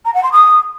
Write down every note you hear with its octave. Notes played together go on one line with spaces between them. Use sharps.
A#5
F#5
C6
D#6